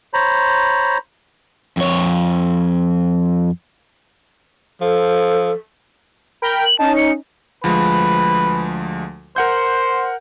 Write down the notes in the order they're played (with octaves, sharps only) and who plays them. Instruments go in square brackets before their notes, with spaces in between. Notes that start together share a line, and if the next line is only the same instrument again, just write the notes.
[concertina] C5 C#5 A#5 B5
[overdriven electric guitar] F2 C#5
[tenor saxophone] F3 [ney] A4
[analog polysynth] A#4 G5 B5
[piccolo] F#7
[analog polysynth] C#4 D#4 [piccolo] A5
[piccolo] C#7
[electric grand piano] D2 F3 G#3 [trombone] B4
[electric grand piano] A#4 F#5 G6 [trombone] C5